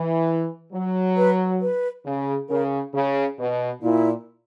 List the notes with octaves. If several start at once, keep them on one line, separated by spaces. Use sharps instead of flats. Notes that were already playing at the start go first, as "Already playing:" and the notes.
Already playing: E3
F#3
B4
B4
C#3
C#3 A#4
C#3
B2
A#2 E4